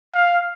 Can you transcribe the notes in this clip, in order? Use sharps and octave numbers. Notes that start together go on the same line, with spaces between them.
F5